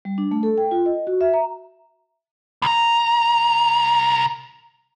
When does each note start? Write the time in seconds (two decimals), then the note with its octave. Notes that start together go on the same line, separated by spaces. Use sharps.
0.05 G3
0.18 D4
0.31 A3
0.43 A4
0.58 G5
0.71 F4
0.86 D#5
1.07 F#4
1.21 E5
1.34 A#5
2.62 C2 A#5